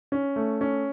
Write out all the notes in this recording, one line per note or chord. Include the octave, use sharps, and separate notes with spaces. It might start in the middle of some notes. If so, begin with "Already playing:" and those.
C#4
A3
C#4